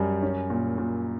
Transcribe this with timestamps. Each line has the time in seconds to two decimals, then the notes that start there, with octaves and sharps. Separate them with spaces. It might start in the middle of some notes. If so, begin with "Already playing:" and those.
Already playing: F#2 G3
0.22 C#4
0.50 A#2
0.78 A#2